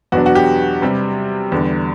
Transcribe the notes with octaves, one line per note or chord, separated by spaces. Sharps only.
E2 B2 F#3 B3 D4 F#4
F#4
G4
C3 G3 C4
E2 D3 G3